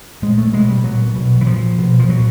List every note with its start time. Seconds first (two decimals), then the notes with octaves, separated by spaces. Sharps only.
0.22 A#2 G#3
0.38 A3
0.53 B2 G#3
0.69 G3
0.84 A#2 F#3
1.15 B2
1.41 E3
1.46 A#2 F3
1.78 B2
1.99 F3
2.09 A#2 F#3